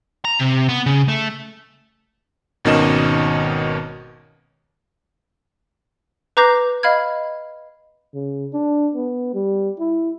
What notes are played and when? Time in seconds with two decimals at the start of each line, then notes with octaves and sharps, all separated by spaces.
0.25 A#5
0.39 C3
0.69 B3
0.86 C#3
1.08 A3
2.65 G#1 B2 D#3 C#4 D#5 E7
6.37 B4 A#5 D6 G6 A#6 C7
6.83 D#5 F5 B5 F6 G#6
8.14 C#3
8.53 D4
8.95 B3
9.34 G3
9.79 E4